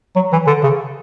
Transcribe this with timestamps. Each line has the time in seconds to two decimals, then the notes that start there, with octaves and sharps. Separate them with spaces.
0.16 F#3
0.32 E3
0.47 D3
0.63 C#3